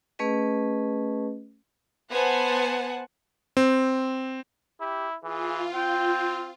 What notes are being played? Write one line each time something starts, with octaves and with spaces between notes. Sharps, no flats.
A3 C#4 G#4 B4 D#5
B3 C5 F#5 G#5 A5
C4
E4 G4
E3 F4 G#4
C4 G5